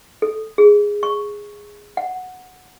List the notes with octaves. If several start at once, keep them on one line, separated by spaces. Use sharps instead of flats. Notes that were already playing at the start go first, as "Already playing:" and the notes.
A4
G#4
C#6
F#5